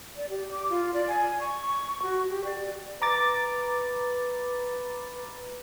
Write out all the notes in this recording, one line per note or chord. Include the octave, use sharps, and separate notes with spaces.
D5
G4
D6
F4
D5
G#5
C#6
C#6
F#4
G4
D5
B4 A#5 D6 A6